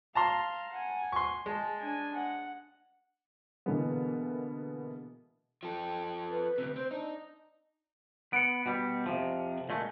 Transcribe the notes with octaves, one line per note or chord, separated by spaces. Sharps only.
F5 A5 A#5 C6
F#5 G#5
C6 C#6
G#3 A5
D4 G#5
F#5
B2 D3 E3 G#3 A#3 B3
F3 A4 G5
B4
D2 C3
C4 C5
D4 D#4
B3 C#7 D7
B2 G3
F2 C3 F3
A#2 G#3 A3